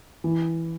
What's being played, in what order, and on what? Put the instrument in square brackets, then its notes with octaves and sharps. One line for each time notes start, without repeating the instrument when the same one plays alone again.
[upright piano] E3